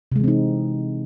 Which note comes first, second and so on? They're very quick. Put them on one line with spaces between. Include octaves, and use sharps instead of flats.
C3 G#3 E3 C4 D#4